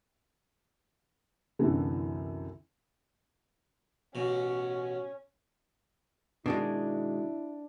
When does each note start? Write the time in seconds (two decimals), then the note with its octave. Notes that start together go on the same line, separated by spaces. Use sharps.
1.59 C2 F#2 D3 E3 A3
4.15 A1 B2 C#4
6.46 B2 D#3 G#3 D4 E4